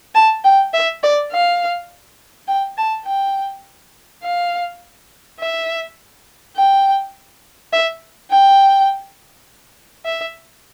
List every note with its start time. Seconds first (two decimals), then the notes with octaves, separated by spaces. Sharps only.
0.15 A5
0.44 G5
0.74 E5
1.03 D5
1.32 F5
2.48 G5
2.77 A5
3.06 G5
4.23 F5
5.40 E5
6.56 G5
7.73 E5
8.30 G5
10.05 E5